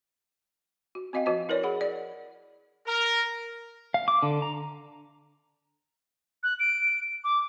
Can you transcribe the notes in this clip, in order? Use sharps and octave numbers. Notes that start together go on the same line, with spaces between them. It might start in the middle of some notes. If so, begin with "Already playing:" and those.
F#4
C4 F#4 D#5 F5 G5
F3 F#4 C5 D#5 A5
E4 A#4 B4 C#5 D5
G#4 F#5 B5
D5
A#4
F5
D6
D3
A#5
F#6
D7
D6